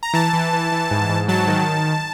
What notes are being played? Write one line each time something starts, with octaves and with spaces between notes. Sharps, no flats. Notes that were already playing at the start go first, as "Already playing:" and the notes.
A#5
E3 A5
E3
E3
E3
G#2
G#2
F#3 A5
D#3